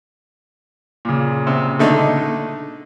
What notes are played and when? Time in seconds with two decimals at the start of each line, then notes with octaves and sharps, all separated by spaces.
1.05 A#2 C#3
1.47 C3
1.79 D3 A3 D#4